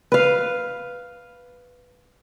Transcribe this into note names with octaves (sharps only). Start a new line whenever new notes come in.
B4 F5